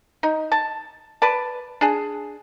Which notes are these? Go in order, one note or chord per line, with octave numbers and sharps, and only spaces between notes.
D#4
A5
B4 D5 A5
D4 G#4